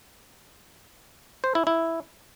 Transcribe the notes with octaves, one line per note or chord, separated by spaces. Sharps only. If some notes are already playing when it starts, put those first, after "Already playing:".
C5
E4
E4